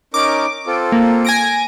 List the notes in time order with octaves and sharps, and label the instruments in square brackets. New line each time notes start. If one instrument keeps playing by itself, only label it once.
[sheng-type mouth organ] C#4 D#4 A#4 [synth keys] D6
[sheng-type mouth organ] C4 F4 A4
[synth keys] A#3
G#5 A#6 D7